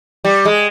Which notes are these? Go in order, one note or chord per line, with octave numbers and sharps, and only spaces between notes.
G3
G#3